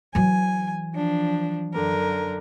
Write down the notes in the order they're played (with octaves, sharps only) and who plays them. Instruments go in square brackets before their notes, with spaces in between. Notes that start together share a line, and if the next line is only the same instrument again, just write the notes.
[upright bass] E3 F#3 [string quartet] G#5
[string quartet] F3 D4
F#2 D3 A#4